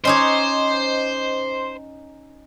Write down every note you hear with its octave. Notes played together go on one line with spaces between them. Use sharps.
C#4 D#4 C5 C#5 D#5 C6 D6